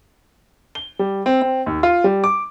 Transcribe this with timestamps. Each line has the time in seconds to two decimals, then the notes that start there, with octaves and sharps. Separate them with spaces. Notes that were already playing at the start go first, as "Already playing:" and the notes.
0.75 G7
0.99 G3
1.26 C4
1.42 C4
1.66 D#2
1.83 F4
2.04 G3
2.24 D6